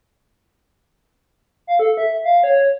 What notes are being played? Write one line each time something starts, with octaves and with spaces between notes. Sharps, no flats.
F5
A4
E5
F5
C#5